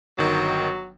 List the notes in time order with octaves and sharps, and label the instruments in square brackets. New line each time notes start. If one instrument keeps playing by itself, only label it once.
[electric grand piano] G1 D#3 [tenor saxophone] F#3